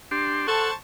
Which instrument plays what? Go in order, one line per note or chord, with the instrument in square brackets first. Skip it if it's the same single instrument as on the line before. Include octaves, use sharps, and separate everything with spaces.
[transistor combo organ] D4 G4 C6
[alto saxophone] A4 [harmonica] C5 A5 C#6 [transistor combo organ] F#5